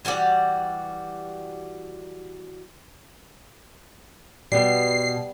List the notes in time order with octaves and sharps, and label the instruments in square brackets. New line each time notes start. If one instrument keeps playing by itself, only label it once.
[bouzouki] E3 G3 F#4 D5
[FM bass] B2 [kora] G3 B3 [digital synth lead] C7